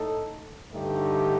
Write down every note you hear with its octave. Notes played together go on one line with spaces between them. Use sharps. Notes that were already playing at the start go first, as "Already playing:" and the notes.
Already playing: A2 A3 D#4 A4
G2 D3 A3 D#4 G4